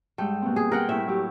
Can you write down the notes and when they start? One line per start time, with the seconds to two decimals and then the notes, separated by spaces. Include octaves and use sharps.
0.18 G#2 G3 A3 G5
0.42 B2 A#3 C4
0.56 G#4
0.71 G#4 A#4 F#5 G5
0.89 A2 A3 E4 E5
1.07 F#3 E4 G4